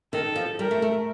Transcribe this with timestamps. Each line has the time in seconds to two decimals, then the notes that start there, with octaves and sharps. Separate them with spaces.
0.13 D#3 A4
0.36 F3
0.59 G3 A#4
0.71 A3
0.82 A3